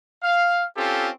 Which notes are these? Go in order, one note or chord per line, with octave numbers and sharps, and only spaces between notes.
F5
C4 C#4 F4 G4 A4